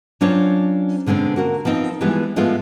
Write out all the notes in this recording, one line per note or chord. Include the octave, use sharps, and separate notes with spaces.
F#3 C#4 D4 F4 C5 C#5
B2 D3 G#3 C4 C#4
A#3 F#4 A#4
F3 B3 C4 D#4
E3 F3 G3 G#3 B3
A2 F3 G#3 A3 B3 F4